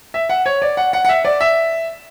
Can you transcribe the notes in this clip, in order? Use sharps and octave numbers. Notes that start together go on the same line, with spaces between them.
E5
F#5
C#5
D5
F#5
F#5
F#5
E5
D5
E5